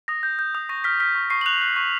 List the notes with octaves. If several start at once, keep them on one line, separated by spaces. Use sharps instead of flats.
D#6 A#6
G6
G6
D#6
C#6 A#6
F6 B6
F6 B6
C#6
C#6 C7
F#7
F#6 F7
F#6
C#6